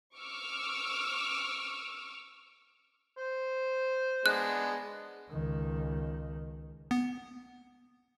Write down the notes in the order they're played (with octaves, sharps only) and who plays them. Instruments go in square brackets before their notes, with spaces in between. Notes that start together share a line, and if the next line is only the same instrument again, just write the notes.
[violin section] C#6 D6 E6 F6
[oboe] C5
[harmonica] G#3 B3 D4 [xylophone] F#6
[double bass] C#2 D#3
[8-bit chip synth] B3